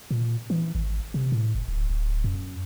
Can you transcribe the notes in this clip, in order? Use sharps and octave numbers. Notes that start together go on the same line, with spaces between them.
A#2
E3
G#1
C3
A2
F#1
D1
D1
F#2